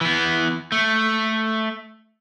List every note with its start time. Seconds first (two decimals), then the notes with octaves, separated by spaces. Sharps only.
0.01 E3 B3
0.72 A3